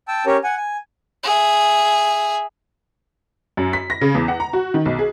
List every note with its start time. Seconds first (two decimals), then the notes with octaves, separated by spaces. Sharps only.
0.08 G5 A5 E6
0.26 C#4 G4 A#4 C#5
0.44 F#5 G#5
0.56 G#5
1.24 G#4 E5
3.57 F#2
3.73 B6
3.90 A#6
4.01 C#3
4.15 E2
4.28 F#5
4.40 A#5
4.53 F#4
4.74 D#3
4.86 B1
4.99 G#4